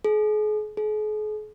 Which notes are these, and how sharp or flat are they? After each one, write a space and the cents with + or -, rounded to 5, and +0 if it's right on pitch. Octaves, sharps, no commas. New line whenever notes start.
G#4 +40
G#4 +45